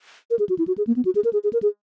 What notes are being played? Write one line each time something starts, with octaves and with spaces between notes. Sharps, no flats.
A#4
G#4
F#4
E4
F#4
G#4
A#3
B3
F#4
G#4
A#4
G#4
G#4
A#4
G#4